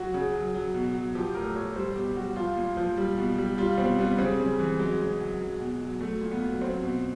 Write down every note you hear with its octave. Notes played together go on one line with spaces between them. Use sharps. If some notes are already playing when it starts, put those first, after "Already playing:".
Already playing: F#3 F#4
C#3
F#3
F#3
B2
F#3
F3 G4
A2 A#4
F3 C#5
G3 C5
B2 G4
G3 F#4
F3 F4
A#2
F3
G3
B2
G3
G3 F4
B2 C4
G3 B3
C#3 C4
C#3
E3
F#3 G#3
C#3
F#3
F#3
B2
F#3
F#3 A3
A#2
B3
F#3
F#3 C4
B2